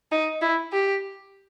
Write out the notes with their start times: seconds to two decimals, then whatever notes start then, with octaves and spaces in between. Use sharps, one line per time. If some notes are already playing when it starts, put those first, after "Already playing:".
0.12 D#4
0.42 E4
0.73 G4